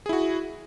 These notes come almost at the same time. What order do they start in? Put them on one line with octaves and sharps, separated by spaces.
G#4 E4 F#4